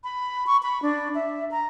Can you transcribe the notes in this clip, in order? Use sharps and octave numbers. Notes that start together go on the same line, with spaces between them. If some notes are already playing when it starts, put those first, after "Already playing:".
B5
C#6
B5
D4
E5
A#5